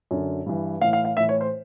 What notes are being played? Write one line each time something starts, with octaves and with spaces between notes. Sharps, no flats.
F#2 D3
G2 E3
A2 E3 F5
F5
F5
A2 E3 E5
C#5
C5